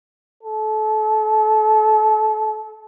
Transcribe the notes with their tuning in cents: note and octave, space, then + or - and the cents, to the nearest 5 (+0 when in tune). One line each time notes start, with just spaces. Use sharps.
A4 -30